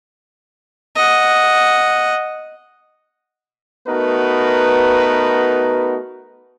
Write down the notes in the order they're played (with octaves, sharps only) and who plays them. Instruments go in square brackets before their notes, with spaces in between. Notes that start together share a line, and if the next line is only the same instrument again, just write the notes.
[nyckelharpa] D#5 F#5
[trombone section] A3 B3 D#4 F#4 A#4 B4